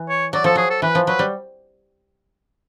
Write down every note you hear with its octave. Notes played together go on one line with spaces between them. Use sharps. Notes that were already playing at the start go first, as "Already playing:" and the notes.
Already playing: E3
C#5
F#3 D5
F3 A4
F#3 G#4
A4
E3 B4
F3
F#3 B4
G3